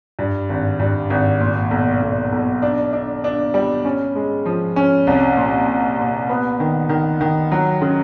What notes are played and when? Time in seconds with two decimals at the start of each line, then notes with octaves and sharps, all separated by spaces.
0.19 G2
0.49 G#1
0.80 G2
1.10 G#1
1.41 A#2
1.71 B1
2.02 B1
2.32 B1
2.62 D4
2.93 D4
3.24 D4
3.54 G3
3.85 C#4
4.15 G#3
4.45 F3
4.76 C#4
5.07 C2
5.37 A#2
5.68 A#2
5.99 A#2
6.29 B3
6.60 D#3
6.89 D#3
7.21 D#3
7.51 F#3
7.81 C#3